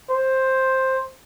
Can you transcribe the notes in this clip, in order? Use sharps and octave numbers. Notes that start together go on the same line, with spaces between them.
C5